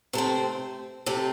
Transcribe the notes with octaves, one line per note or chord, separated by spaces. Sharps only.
C3 A3 C4 C5
C3 A3 C4